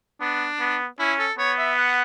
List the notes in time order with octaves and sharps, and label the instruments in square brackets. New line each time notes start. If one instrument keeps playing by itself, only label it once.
[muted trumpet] B3 [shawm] D4
[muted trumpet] B3
[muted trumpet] C#4 [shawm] E4
[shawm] A4
[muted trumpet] B3 [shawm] C#5
[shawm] E5
F#5